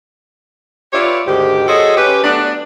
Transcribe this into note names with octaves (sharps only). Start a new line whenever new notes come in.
F4 G4 B4 C#5 D5 E5
D2 G#2 D#3 G4
F#4 G#4 A4 C5 C#5 D#5
C#4 G4 B4
F#3 A3 B3 D4